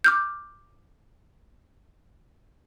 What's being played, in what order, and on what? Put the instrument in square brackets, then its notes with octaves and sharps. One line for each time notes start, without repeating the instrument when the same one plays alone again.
[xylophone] D6 F6 G6